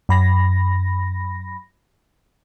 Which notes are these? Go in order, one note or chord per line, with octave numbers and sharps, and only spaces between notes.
F#2 B5 A#6